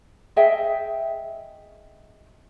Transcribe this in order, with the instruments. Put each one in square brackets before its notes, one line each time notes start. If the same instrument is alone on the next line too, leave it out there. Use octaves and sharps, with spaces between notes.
[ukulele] G#4 D#5 E5 G5